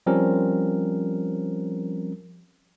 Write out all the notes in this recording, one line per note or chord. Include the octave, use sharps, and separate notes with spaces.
F3 G3 C4 C#4 A#4